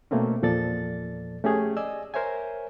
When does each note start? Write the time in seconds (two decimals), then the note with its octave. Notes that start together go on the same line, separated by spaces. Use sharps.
0.11 B2 A3 A#3 C4 C#4
0.42 E2 A#2 F3 A4 D5 A6
1.44 A3 C#4 G4 G#4
1.77 D5 D#5 G#5 E6
2.14 A#4 C5 C#5 E5 G#5